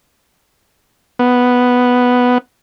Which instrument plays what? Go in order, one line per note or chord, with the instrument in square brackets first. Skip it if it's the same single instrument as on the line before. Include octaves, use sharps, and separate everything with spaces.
[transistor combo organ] B3